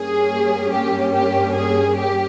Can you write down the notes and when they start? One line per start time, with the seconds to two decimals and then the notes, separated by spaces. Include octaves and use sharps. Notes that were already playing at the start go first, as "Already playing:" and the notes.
Already playing: G2 G3 A#3 C#4 G#4
0.72 G4
1.14 G4
1.55 G#4
1.97 G4